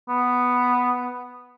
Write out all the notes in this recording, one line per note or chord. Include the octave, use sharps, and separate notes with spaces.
B3